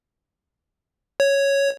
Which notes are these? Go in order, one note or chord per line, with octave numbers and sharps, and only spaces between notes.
C#5